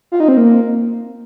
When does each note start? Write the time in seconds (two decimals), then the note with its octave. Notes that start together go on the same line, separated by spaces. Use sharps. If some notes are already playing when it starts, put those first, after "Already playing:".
0.12 F4
0.20 D#4
0.28 C4
0.37 A#3